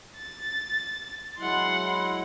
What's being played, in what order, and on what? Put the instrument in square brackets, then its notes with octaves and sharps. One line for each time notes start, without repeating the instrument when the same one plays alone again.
[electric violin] A6
[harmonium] F#3 G#3 E4 [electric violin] F#5 C6